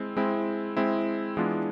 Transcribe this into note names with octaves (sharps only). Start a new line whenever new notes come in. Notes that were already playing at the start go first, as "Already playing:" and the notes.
Already playing: G#3 C4 E4
G#3 C4 E4
G#3 C4 E4
E3 G#3 B3 D4 F4